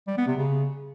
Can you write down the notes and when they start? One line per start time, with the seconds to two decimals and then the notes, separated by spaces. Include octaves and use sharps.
0.07 G3
0.17 B3
0.27 C3
0.37 C#3